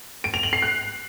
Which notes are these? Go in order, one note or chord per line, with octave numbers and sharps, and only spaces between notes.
D7
F7
F#7
C7
F#6